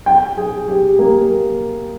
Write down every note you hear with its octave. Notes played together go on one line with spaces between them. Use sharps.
G5
G#4
G4
A#3